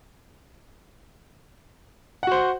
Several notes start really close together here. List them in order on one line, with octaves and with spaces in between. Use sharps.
F#5 F#4 C5